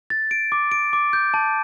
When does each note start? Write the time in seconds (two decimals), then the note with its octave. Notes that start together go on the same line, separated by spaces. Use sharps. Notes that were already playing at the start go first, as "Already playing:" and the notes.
0.10 A6
0.31 D7
0.52 D6
0.72 D7
0.93 D6
1.13 G6
1.34 A5